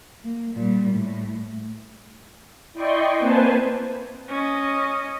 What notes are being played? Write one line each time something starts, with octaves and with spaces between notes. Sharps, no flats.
A#3
A#2 G3
A2
E4 D5 D#5 G5 C6 C#6
A#3 C4 B4 C5 G#5 A5
C#4 D#5